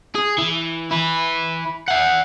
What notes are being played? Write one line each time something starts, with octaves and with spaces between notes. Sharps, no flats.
G#4
E3
E4 B4
E5 F#5